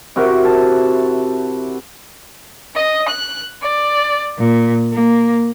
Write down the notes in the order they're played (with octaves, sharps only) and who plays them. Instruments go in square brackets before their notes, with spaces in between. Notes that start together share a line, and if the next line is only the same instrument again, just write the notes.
[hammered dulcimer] C3 E4 F#4 A#4
A5
[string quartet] D#5
F#6
D5
A#2
A#3